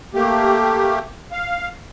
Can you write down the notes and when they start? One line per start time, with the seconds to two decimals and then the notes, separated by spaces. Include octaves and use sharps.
0.14 A3 A#3 G4
1.32 F5